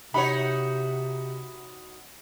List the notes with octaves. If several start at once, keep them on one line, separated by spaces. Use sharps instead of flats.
C3 D#4 F#4 C#5 B5